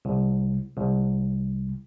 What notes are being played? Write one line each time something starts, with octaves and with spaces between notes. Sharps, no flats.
C2
C2